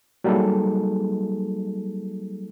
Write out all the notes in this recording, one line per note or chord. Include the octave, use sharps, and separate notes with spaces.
F#3 G3 A#3 D#4 G#4 A4